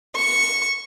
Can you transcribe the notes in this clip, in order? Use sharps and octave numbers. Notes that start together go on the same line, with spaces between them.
C#6